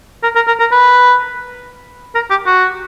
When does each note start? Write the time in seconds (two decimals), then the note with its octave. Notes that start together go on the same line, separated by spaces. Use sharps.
0.23 A#4
0.35 A#4
0.47 A#4
0.60 A#4
0.72 B4
2.15 A#4
2.30 G4
2.46 F#4